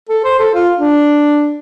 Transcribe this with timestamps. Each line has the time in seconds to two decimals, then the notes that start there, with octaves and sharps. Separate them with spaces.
0.09 A4
0.24 C5
0.39 A4
0.54 F4
0.77 D4